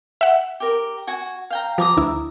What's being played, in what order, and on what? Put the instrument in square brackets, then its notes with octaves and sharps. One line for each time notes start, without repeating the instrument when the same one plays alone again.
[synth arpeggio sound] E5 F#5
[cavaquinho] G4 A#4
F#4 G#5
F5 G5 A#5
[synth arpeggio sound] F3 [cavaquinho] A#5 D6 D#6
[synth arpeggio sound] D2 E4